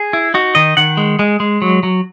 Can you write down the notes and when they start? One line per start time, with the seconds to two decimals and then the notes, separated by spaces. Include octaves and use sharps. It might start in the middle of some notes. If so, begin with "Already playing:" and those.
Already playing: G#4
0.13 E4
0.34 D#4 F#4
0.55 D#3 D#5
0.77 D#3 F#5
0.97 G#3
1.19 G#3
1.40 G#3
1.62 F#3
1.83 F#3